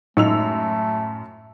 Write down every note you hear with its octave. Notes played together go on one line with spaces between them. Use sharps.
F#2 A2 G#3 A3 D#4 F4 E6 F7